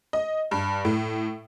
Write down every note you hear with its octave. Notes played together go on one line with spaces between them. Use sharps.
D#5
G2
A2